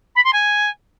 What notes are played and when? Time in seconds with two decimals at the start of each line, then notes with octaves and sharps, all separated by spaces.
0.15 B5
0.24 C6
0.33 G#5